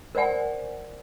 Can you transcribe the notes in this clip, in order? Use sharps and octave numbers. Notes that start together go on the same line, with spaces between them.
A#4 C5 D5 F#5 G#5